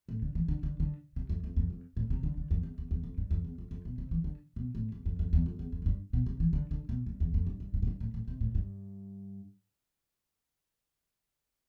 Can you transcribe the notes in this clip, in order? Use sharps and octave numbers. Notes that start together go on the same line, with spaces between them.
A2
D3
E3
D3
D3
D3
C3
F2
F2
F2
F2
A2
C3
D3
D3
F2
E2
E2
E2
F2
G2
F2
E2
F2
F2
B2
C3
E3
D3
B2
A2
E2
F2
F2
E2
F2
E2
F2
A2
G2
B2
C3
E3
D3
D3
B2
G2
E2
F2
G2
G2
G2
A2
G2
A2
A2
C3
A2
G2